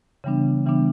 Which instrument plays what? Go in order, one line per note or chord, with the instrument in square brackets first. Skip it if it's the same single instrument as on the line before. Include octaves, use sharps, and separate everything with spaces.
[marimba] C#3 E3 G3 B3 D4
C#3 E3 G3 B3 D4